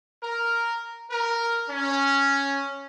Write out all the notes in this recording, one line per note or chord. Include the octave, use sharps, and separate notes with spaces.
A#4
A#4
C#4